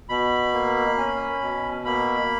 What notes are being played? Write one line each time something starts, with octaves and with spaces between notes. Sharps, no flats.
B2 B5
A#3
C#4
B2
A#3 B5